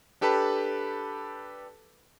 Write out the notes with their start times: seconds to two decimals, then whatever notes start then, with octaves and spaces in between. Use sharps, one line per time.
0.21 D4 G4 A4 B4 A5 B5